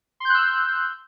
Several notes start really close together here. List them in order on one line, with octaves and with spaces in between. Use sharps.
C6 G6 F#6 E6